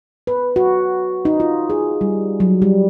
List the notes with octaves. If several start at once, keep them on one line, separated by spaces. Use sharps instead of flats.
B4
F#4
D#4
F4
G#4
G3
F#3
G3